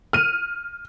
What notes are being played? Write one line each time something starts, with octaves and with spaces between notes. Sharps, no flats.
F6 D#7